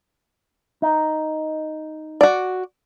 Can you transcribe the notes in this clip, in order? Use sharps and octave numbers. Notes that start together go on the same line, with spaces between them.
D#4
F#4 D5